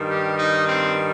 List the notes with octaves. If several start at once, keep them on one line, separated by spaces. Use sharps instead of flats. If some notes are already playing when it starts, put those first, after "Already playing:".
Already playing: G2 D#3
G4
D#4
C4